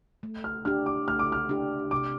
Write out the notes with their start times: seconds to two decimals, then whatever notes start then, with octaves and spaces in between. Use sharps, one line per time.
0.23 A3
0.44 F6
0.65 D4 G4 F6
0.86 D6
1.08 A3 F6
1.19 D6
1.32 F6
1.49 D4 G4
1.91 C3 D6